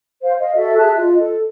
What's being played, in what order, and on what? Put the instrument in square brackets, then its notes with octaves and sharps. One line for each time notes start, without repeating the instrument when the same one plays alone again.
[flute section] C5 F5
D#5 F5
F#4 A4 E5
G#4 E5 A5 F#6
F4 D#5
A4